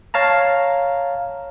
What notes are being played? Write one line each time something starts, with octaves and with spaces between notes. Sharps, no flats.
C#5 F5 A5 A#5